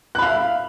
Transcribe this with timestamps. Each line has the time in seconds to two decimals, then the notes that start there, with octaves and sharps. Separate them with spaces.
0.15 F#6
0.19 B5
0.22 F5
0.26 E5